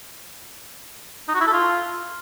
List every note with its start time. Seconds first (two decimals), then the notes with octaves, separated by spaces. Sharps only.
1.28 D#4
1.35 F#4
1.41 E4
1.47 A4
1.53 F4